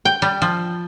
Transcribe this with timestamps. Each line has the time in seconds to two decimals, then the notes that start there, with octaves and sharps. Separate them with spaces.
0.05 G5
0.22 G3
0.42 F3